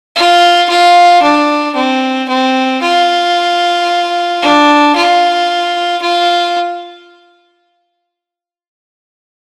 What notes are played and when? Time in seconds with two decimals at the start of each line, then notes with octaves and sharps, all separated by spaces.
0.16 F4
0.69 F4
1.23 D4
1.76 C4
2.29 C4
2.82 F4
4.42 D4
4.96 F4
6.02 F4